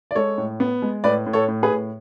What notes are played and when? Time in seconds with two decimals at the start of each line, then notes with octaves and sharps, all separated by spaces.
0.11 D5
0.15 G#3 A4 C#5
0.38 A2
0.60 B3
0.82 G#3
1.04 A2 B4 D5
1.26 A2
1.33 A4 C#5
1.48 A2
1.63 G#4 B4
1.70 A2